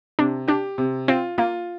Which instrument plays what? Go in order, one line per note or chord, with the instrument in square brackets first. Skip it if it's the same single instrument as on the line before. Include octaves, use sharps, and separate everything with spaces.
[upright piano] C3 [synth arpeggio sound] D4
[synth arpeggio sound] D4 [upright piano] G4
[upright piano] C3
[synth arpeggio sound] C4 [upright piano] F4
[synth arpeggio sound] A#3 [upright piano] F4